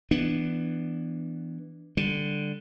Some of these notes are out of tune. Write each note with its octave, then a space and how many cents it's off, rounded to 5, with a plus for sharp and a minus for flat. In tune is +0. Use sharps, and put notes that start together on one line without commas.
E3 +0 B3 +5 D4 +10
D3 +0 G3 +0